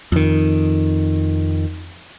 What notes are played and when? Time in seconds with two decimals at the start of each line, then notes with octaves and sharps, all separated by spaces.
0.12 F2 D#3